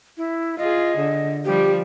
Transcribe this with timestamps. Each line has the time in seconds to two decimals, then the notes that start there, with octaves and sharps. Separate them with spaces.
0.17 E4
0.58 F4 G#4 D#5
0.97 D3
1.45 F3 G3 G4